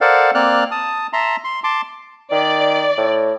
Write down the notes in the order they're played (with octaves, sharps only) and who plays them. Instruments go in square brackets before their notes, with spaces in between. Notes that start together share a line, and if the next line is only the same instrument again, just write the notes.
[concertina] A4 A#4 C5 D5 F5 F#5
A#3 C4 D5 F6 F#6
A5 D#6
E5 A5 A#5 C6
C6
A5 C6 D6
[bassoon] D#3 [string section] D5
[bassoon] A2